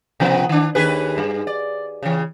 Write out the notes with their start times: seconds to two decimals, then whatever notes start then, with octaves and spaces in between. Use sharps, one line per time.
0.20 C3 F3 B3
0.49 D#3 D4
0.75 D#2 G#4 B4
1.18 G2
1.47 D5
2.03 C#3 E3